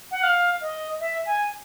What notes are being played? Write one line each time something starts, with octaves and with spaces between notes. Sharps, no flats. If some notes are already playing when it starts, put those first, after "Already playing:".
F#5
F5
D#5
E5
G#5